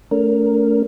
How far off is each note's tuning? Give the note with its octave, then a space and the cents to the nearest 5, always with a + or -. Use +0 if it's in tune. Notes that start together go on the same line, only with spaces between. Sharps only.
A3 +0 C#4 +40 A#4 +0